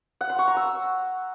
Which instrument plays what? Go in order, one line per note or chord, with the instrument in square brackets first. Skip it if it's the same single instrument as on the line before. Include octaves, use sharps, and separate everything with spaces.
[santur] F#5
C6
C#6
A#5
E6